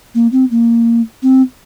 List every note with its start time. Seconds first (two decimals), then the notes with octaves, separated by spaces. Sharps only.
0.15 A#3
0.32 C4
0.51 A#3
1.23 C4